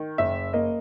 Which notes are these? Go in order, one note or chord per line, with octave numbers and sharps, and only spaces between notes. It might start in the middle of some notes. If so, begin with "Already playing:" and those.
Already playing: D#3
F#1 E5
A#3 D#5